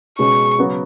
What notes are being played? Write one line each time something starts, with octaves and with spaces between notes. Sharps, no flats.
B2 G#3 C#4 C#6
C#3 F#3 B3 F#4